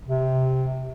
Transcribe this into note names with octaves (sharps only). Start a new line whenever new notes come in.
C3